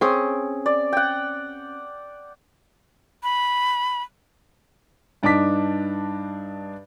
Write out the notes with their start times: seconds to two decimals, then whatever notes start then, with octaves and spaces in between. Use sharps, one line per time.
0.01 C4 C#4 G#4
0.66 D5
0.93 F#5 G5
3.22 B5
5.23 G2 D4 D#4 A5 D6 B6